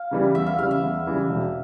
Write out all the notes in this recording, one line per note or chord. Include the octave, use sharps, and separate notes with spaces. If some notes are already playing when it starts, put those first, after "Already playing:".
Already playing: F5
C#3 E3 G3
E2 E5
F5
C#3 E3 G3 F5
E5
E2
C#3 E3 G3
E1